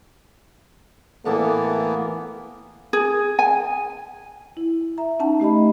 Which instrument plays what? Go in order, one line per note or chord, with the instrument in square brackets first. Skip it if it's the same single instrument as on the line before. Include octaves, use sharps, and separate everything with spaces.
[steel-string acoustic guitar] A2 A4 A5 [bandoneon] E3 A#3 B3
[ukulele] G#4
G#5
[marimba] E4
E5 A#5
C#4 D#4 F#5 A5
A3 G4 D#5 B5